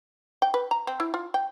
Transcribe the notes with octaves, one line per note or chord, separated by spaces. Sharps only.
G5
B4
A#5
C4
E4
F4
G5